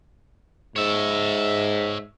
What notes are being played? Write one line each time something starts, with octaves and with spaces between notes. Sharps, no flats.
G#2 C#5 E5